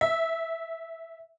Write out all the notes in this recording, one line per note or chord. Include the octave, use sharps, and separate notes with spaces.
E5